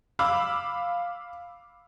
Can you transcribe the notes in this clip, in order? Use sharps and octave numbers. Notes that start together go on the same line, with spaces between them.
F5 B5 D6 E6